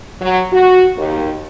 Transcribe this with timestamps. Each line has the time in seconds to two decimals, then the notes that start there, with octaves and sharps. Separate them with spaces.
0.21 F#3
0.53 F#4
0.96 D#2